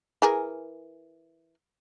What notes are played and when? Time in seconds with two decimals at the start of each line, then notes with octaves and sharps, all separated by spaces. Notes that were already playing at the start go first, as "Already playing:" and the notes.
0.22 E3 G#4 A#4